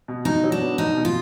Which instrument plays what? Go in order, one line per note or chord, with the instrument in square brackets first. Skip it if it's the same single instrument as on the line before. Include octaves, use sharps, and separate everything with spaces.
[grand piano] B2
[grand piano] B2 [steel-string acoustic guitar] D#4
[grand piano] F#3
[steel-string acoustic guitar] D4
[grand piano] B3
[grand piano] B2 [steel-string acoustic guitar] D#4
[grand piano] B2
[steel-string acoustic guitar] F4